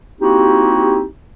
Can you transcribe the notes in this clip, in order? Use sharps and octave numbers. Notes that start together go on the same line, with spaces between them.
A#3 C4 D#4 E4 F#4 G4